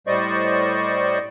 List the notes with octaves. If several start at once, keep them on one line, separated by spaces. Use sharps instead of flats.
A2 G3 C5 D5 D#5 C#6